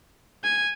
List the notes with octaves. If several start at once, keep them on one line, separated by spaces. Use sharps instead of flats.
G#5